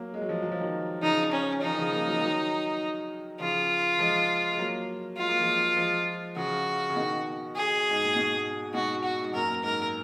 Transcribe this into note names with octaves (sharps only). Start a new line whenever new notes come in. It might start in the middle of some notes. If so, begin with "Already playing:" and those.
Already playing: F#3 A#3
G#3
F#3
F3 G#3
F#3
F3
D#3 F#3
C#3 F3 D#4
C#4
F3 D#4
D#3
C#3 F3
A#3
G#3
F#3
F3 G#3
D#3 F#3
C#3 F3 F4
F3 G#3
G#3
F#3 A#3
G#3 F4
A#3
F3 G#3
F3 G#3
C#3 F3 F#4
C#3
B2 D#3
G#4
G#2
A#2
G#2 B2
G#2 B2 F#4
F#4
G#2
F#2 A#2 A#4
G#2 A#4